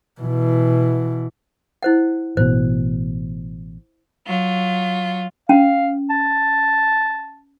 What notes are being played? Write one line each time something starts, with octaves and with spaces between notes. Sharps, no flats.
B2 E3
E4 C5 F#5
A1 B2 C5
F#3 F4
C#4 F5
A5